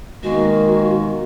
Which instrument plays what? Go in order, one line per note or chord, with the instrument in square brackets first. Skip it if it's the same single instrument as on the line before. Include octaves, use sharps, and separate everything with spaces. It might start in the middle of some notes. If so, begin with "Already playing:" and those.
[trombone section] B2 D#3 A#3 [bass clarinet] G#3 [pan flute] F#4